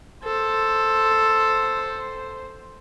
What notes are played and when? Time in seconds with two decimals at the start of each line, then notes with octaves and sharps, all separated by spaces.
0.24 A4 C5